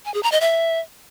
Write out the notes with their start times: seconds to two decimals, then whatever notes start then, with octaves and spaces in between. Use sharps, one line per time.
0.05 G#5
0.14 G#4
0.23 A#5
0.32 D#5
0.41 E5